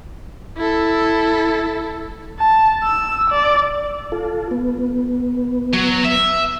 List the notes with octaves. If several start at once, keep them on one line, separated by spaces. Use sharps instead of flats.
E4 A4
A5
E6
D5
F4 A4
B3
B3
F#3
E5